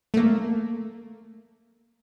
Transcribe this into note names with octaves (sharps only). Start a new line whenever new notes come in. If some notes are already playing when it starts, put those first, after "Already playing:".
A3 A#3